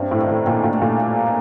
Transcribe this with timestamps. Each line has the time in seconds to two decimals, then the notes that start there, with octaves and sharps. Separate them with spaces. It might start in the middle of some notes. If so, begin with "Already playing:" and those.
Already playing: G2 C3
0.11 A2
0.20 D#3
0.28 A2
0.46 A#2 D#3
0.64 A#2
0.73 A3
0.82 A#2
1.00 A#3
1.26 D#4